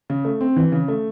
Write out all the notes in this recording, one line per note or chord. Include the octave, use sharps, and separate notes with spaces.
C#3
A3
C4
E3
C#3
A3